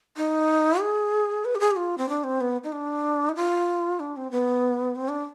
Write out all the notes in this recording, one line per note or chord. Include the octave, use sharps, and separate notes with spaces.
D#4
G#4
B4
G4
G#4
G4
F4
C4
D4
C4
B3
D#4
D4
D#4
F4
D4
C4
B3
C4
D4